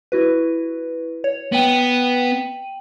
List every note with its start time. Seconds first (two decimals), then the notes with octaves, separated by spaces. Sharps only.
0.12 E4 F#4 B4
1.24 C#5
1.52 B3 G5 D#7 F#7